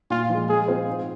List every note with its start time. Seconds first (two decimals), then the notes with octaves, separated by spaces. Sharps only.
0.10 A#2 F4
0.30 F3 G#3
0.49 G#3 G#4
0.68 C4 F4 G#4 C5
0.87 G#2